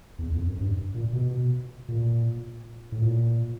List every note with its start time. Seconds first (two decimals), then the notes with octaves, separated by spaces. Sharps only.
0.19 E2
0.33 F2
0.47 F#2
0.61 G2
0.95 A#2
1.13 B2
1.89 A#2
2.92 A2
3.02 A#2